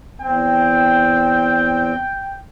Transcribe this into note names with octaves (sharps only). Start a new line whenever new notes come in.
E2 C4 G5